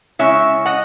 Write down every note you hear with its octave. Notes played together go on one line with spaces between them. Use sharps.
C#3 G#3 C#4 E4 C#5 E5
D#5 F#5